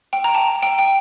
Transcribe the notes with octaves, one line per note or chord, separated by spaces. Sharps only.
G5
A#5
A5
G5
G5